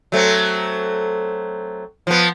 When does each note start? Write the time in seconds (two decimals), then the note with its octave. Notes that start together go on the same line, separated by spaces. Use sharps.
0.12 F#3 A3 C4
2.07 F3 B3